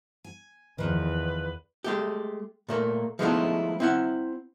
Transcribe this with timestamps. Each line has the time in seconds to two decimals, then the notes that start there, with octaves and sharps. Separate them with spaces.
0.24 G#5
0.78 E2 D#3 F3 B4
1.84 G#3 A3 G4
2.69 A#2 A3 A#3
3.19 F3 G#3 A3 B3 D#4 E4
3.80 C4 E4 F#5